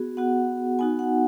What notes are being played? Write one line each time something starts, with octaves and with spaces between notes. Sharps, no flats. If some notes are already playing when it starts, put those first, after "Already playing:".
Already playing: B3 F#4 G#4
B3 F#4 F#5
B3 D#4 F#4 G#5
F#5